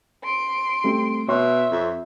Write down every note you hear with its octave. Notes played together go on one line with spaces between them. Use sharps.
C6 D7
G3 A3 C4
B2 C#5 E5 C6 C#6
F2